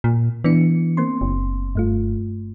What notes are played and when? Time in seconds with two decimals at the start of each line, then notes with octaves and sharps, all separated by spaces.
0.04 A#2
0.44 E3 B3 D4 C#7
0.97 A#3 C4 C6
1.21 F#1
1.75 G2 A3 F4